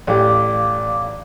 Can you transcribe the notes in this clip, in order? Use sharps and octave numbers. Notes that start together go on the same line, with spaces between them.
A1 G4 D5 F5 D6